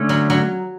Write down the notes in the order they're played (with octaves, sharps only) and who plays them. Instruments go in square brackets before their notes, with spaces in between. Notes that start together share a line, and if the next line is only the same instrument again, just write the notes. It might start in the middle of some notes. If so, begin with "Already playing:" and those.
Already playing: [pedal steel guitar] D3 A3 C#4
[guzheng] F#3
F#3